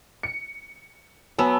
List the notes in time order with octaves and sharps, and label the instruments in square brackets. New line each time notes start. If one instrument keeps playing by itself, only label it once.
[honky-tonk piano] C#7
[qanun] F#3 B3 [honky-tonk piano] G#5 A5 E6